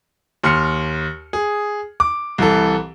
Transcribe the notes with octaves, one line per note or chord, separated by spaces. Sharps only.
D#2 C6 F6 C#7
G#4
D6
C2 E3 A4